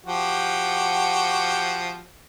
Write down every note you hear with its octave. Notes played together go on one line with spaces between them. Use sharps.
F3 F#4 G4